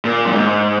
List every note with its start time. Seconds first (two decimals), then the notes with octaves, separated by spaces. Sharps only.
0.05 A#2
0.25 F#2
0.33 G#2